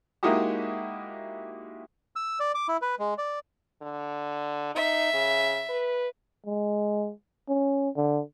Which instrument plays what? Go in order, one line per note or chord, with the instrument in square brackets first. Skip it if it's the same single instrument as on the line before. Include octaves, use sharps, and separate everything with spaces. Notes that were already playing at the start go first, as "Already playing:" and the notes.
[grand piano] G#3 A#3 D#4 E4 F#4 G4
[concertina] E6
D5
D6
E4
B4
G#3
D5
[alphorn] D3
[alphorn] D#4 [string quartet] E5
[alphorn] C#3
B4
[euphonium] G#3
C#4
D3